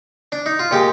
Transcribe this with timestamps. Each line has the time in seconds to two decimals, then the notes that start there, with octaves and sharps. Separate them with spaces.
0.32 D4
0.46 D#4
0.59 F4
0.71 A#2 G#3 G4